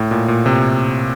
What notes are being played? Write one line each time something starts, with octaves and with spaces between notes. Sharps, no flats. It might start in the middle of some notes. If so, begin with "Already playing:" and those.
Already playing: A2
A#2
A#2
C3